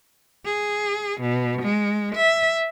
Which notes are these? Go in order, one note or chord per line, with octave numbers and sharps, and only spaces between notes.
G#4
B2
G#3
E5